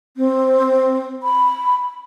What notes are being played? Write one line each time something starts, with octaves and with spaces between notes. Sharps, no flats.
C4
B5